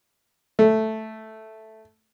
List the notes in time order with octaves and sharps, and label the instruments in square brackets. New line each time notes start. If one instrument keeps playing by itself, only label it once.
[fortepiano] A3